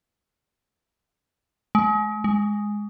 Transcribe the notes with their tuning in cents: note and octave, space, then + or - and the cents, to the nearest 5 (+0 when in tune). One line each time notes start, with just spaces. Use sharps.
G#3 +35
G#3 +0